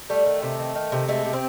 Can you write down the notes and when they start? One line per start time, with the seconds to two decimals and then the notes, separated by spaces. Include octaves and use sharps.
0.09 G3 A3
0.26 D#3
0.42 C3
0.59 D#3
0.75 D#3
0.92 C3
1.08 G#3 A3
1.25 C3
1.33 C4